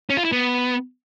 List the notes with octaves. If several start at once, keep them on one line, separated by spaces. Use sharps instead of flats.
C#4
F4
E4
B3